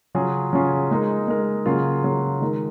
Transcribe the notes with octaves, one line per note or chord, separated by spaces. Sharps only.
C#3 F#3 C#4 F4 G#4
C#3 F#3 C#4 F4 G#4
G#3 D#4 A#4
G#3 D#4 A#4
C#3 F#3 A#3 F4
C#3 F#3 A#3 F4
D#3 G#3 D#4 A#4